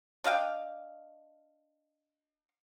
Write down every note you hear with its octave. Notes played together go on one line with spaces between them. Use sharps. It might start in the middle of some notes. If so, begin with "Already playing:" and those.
D4 D#5 F5 G5